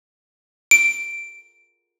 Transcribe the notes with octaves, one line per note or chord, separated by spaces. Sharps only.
D7